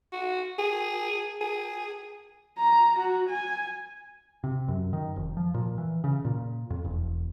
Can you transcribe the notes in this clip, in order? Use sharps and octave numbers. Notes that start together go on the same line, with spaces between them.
F#4
G#4
G#4
A#5
F#4
G#5
C3
F#2
D#3
F1
F3
A#2
E3
C#3
A#2
F2
E1